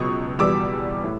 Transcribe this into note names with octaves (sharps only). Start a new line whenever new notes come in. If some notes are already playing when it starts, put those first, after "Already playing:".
Already playing: C#2 B2 F#3 C#6 D#6
E2 B2 G3 D6 E6
A2